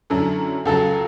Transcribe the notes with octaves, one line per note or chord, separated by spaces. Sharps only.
F#2 D3 F#3 C#4 E4 A4
C#2 C#3 F#3 A4